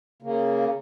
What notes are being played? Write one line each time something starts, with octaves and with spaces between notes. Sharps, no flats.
C#3 A#3